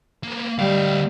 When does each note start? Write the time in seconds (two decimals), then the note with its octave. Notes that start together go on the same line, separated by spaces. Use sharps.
0.23 A#3 B3
0.58 D2 G3 F5